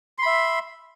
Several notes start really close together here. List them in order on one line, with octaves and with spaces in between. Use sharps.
C6 B5 E5